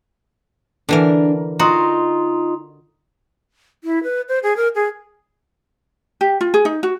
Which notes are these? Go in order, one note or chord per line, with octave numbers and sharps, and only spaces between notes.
D3 E3 D4 A#4 F#5 G#5
D#4 F4 F#4 D#5 A#5 C6 D#6
E4
B4
C5
G#4
A#4
G#4
G4
F4
G#4
D#4
F#4